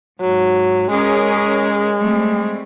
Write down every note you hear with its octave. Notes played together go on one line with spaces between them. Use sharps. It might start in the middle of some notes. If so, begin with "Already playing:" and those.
G#2 F#3
G#3 C#4 G#4 A#4
G3 A3 C4